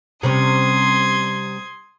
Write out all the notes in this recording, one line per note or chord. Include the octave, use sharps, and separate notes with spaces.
C3 G3 C#4 C6 D#6 G#6